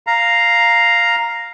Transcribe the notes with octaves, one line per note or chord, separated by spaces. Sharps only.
F5 A#5